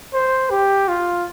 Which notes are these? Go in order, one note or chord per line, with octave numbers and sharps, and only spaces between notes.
C5
G4
F4